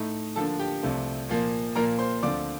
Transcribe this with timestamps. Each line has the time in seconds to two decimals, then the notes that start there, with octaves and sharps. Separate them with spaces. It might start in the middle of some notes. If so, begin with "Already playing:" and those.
Already playing: A2 A3 D#4
0.36 D3 F3 A#3 D4 A4 A5
0.59 G4 G5
0.83 C2 C3 F3 A3 C4
1.29 A#2 F3 A#3
1.75 A#2 F3 A#3 F4 A#4 A#5
1.99 C5 C6
2.22 D2 D3 F3 C4 F4 D5 D6